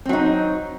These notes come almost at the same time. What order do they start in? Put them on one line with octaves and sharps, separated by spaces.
C4 F#3 D#4